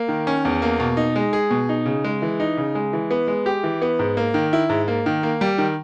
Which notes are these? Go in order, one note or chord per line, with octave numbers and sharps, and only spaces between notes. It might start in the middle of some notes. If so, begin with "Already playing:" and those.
Already playing: A#3
D#3
C#4
E2
A#3
B2
D#4
G#3
G#4
B2
D#4
C#3
G#3
E3
D#4
C#3
G#3
E3
B3
G#3
G4
E3
B3
G#2
A#3
D#3
E4
G#2
A#3
D#3
A#3
G3
D#3